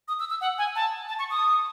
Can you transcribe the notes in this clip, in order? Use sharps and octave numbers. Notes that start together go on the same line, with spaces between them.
D#6
E6
E6
F#5
G#5
A5
A5
C#6
D#6